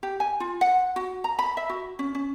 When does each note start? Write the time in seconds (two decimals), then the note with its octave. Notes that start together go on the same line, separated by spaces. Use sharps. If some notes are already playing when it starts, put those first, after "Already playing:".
0.03 G4
0.20 G#5
0.40 F4
0.61 F#5
0.96 F#4
1.24 A#5
1.39 B5
1.57 E5
1.69 F#4
1.99 C#4
2.15 C#4